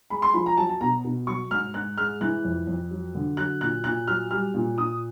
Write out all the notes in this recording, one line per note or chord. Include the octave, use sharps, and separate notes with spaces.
G#3 B5
C6
F3 B5
A#5
F#3 A5
A5
B2 A#5
B2
F#3 C#6
G#2 F6
G#2 F#6
G#3 F6
E3 F#6
F2
F2
F#3
D3
F#3 F#6
A#2 F#6
A#2 F#6
F#3 F6
G3 F6
A#2
A#2 D#6